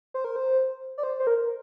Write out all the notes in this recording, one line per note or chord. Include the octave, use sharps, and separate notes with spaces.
C5
A#4
C5
D5
C5
C5
A#4